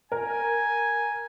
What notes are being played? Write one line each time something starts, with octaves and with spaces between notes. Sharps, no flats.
A#4 G#5